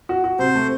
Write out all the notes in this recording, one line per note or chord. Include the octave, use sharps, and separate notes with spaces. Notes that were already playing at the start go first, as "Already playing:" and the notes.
F#4
F#4
C3 C5
A3